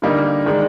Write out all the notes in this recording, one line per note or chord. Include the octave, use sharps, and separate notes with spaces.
D3 G3 A#3 D#4 A#4
D#3 G#3 D4